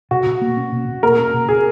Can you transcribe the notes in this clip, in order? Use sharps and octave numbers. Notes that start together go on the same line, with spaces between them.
B2 F#4
B2
A#3
C#4
B2
B2
A#3 A#4
C#4
B2
B2 G#4